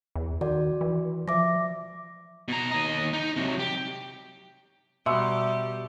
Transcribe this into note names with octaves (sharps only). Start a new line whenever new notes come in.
E2
D#3 F#4 D5
E3
F3 E5 D6 A#6
B2 A#5
D#2 D#5
D#4
C3 F#3
G4
B2 G3 G4 E5 C6 E6 C#7